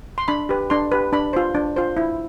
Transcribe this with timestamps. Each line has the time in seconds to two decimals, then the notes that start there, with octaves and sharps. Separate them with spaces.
0.18 C6
0.28 D4 B5
0.49 G4 B4
0.70 D4 C6
0.92 G4 B4
1.13 D4 B5
1.33 F4 C5
1.55 D4
1.76 F4 C5
1.97 E4